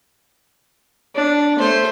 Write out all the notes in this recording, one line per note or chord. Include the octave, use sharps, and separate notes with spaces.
D4
A3 C5